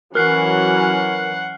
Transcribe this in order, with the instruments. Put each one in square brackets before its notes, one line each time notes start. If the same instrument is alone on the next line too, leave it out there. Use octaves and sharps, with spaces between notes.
[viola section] E3 F#3 C#4 [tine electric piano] A#4 [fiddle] F#5 [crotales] F6 F#6 C7